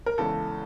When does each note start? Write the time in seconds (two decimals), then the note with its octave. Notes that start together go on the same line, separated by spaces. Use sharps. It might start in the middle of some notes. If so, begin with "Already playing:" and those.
0.06 A#4
0.18 E2 C#3 E3 G#3 A4